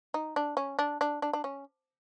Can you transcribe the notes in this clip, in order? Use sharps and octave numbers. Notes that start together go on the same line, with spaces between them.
D#4
D4
C#4
D4
D4
D4
D4
C#4